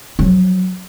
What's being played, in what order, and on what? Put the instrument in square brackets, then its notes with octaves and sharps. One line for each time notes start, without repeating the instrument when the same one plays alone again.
[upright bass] F3 F#3